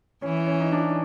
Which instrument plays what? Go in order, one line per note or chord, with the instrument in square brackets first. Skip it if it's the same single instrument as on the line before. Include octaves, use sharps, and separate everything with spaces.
[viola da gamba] E3 [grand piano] C#4
[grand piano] C#4
D#4
D4